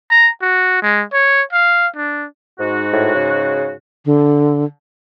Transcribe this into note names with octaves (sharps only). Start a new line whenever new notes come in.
A#5
F#4
G#3
C#5
F5
D4
G#2 F#4
A2
C#3
D3